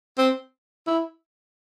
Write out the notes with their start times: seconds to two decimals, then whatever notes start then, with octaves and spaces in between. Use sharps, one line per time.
0.18 C4
0.87 E4